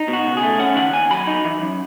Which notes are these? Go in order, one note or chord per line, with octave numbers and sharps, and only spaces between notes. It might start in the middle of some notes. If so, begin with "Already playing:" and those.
Already playing: D#4
B2
F#4
C#2
G#4
A3
C#4 F#5
D#3 F#5
D#2 G#5
F#3 B5
D#4
E3
F#2